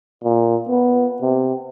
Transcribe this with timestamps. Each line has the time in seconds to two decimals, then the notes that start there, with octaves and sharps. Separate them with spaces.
0.24 A#2
0.69 B3
1.21 C3